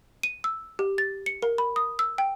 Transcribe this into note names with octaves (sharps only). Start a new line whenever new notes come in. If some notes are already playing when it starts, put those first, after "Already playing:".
D#7
E6
G4
A6
C#7
A#4
B5
D#6
E6
G5